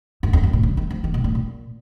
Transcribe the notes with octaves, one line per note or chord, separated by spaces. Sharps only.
F#2
F2
F#2
A#2
C#3
D#3
F3
D#3
B2
A#2
A#2